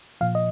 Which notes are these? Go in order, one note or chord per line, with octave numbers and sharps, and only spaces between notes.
A#2 F3 F5
D#5